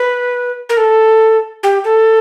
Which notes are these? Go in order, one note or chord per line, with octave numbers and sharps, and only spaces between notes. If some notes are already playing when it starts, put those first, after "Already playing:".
Already playing: B4
A#4
A4
G4
A4